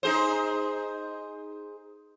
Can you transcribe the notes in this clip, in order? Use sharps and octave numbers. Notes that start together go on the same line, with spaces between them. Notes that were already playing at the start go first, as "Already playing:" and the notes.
D#4 G#4 C5